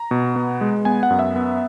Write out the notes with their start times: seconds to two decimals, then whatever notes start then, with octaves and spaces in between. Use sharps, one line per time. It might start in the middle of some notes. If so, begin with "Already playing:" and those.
Already playing: A#5
0.11 B2
0.36 B3
0.61 G#3
0.85 B3 G#5
1.03 F#5
1.10 F#2
1.19 E5
1.36 B3